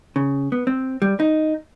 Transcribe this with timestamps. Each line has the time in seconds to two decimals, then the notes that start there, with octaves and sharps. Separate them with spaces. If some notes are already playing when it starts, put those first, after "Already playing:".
0.16 C#3
0.52 B3
0.67 C4
1.02 G3
1.20 D#4